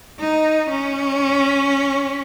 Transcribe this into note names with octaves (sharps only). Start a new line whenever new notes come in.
D#4
C#4